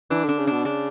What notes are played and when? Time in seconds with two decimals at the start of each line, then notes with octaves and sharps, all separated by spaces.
0.10 E3 D4
0.24 D3 D4
0.39 C#3
0.47 B2 D4
0.65 C#3 D4